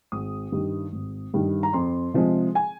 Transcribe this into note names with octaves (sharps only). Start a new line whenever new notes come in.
G#1 D#6
G2 D#3 G3
G#1
G2 D#3 G3
A#5
F2 C6
C3 F3 G#3
G#5